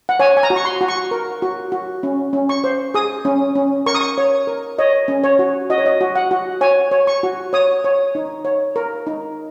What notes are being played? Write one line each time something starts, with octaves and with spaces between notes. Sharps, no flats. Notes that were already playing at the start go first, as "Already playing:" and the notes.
F#5
C#5 G#5
G#5
A#5
F#4
C#6
C6
F#4
C#6
A#4
F#4
F#4
C#4
C#4
C#6
C5
G#4 D#6
C#4
C#4
A#4 C#6
D#6
C#6
C#5
A#4
C#5 D#5
C#4
C#5
F#4
F#4 D#5
C#5
D#5
F#4
F#5
F#4
C#5 G#5
C#5
C#6
F#4
C#5 D#6
C#5
D#4
C#5
A#4
D#4